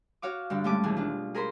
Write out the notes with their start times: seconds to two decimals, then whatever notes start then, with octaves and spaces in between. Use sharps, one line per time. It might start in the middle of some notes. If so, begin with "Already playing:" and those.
0.22 F#4 C#5 F5 D6
0.50 G2 D3 D5
0.64 A2 G3 G#3 C#4 A5 D6
0.83 D#2 B2 E3 G#4
0.97 D4 F4
1.35 G#4 A#4 C5 B5 C6